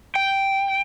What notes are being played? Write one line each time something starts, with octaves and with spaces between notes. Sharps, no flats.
G5